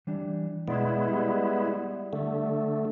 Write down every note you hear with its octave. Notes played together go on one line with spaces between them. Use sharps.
E3 G3 D4
B2 G#3 B3 E4 D5 C6
G3
D3 A3